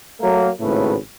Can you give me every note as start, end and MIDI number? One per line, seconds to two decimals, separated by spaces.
0.20 0.49 54
0.20 0.49 57
0.20 0.49 58
0.60 0.96 32
0.60 0.96 45
0.60 0.96 49
0.60 0.96 57
0.60 0.96 71